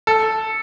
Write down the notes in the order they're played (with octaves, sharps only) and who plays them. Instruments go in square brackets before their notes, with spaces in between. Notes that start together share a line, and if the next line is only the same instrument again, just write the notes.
[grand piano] A4